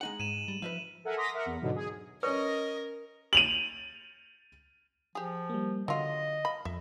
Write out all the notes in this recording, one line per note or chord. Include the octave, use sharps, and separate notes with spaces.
G#3 D#4 F#5 F#7
G#2 D#7 E7
G3
F3 B4 E5 F5
A4 A#4 E5 F#5 G#5 A#5
A#5 C6 D6 D#6 A#6 B6
A#4 E5 F#5
E2
G#2 B2 D3 F#3
G#4
C#4 A#4 B4 C#5 D#5
D#7 F7 F#7
F3 G4 G#4
G3 A#3
D3 F#3 F4 D#5 C6
F5 B5
F2 E5